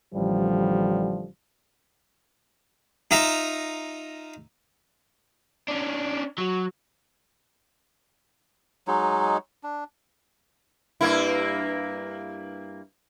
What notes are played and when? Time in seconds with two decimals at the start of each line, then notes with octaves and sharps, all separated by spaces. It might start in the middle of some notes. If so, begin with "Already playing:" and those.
0.15 A1 D3 F3 G3
3.11 D#4 F4 E5 A#5
5.68 C#4 D4
6.38 F#3
8.87 F#3 G#3 D#4
9.63 D4
11.01 G2 A#3 E4